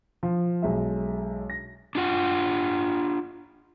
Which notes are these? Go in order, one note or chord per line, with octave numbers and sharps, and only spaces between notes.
F3
B1 G#3 E5
A#6
D4 F4 F#5